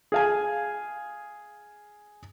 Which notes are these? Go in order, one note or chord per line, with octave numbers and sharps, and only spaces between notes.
G#4 F5 G#5